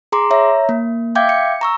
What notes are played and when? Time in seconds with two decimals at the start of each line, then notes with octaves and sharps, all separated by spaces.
0.12 G#4 A#5 C6 D6
0.30 C#5 E5 A#5
0.69 A#3
1.15 E5 F5 G5 D6 G6 G#6
1.29 C#7
1.61 A#5 C#6 E6